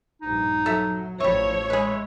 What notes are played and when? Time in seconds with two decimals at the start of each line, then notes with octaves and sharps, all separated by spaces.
0.22 A#1 G2 D#4
0.66 F#3 A4 E5
1.20 A1 F3 G3 C#5 E5 C#6
1.70 G#3 G#4 B4